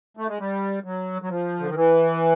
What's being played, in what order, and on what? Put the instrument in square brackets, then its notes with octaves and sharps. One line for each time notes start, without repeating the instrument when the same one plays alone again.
[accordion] A3
G#3
G3
F#3
F#3
F3
D3
D#3
E3